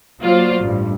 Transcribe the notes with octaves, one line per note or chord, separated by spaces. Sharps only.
F#3 A#3 F4 C5 D5
A1 G2